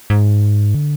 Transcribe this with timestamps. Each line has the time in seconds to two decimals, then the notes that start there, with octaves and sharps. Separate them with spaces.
0.10 G#2
0.75 D3